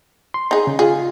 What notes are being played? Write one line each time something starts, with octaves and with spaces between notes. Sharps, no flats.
C6
D#4 G#4
C#3
F4 G#4